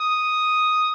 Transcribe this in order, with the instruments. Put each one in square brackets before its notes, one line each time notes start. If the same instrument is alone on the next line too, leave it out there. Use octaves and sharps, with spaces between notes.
[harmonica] D#6